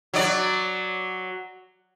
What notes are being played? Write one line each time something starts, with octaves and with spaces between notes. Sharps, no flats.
F#3 D5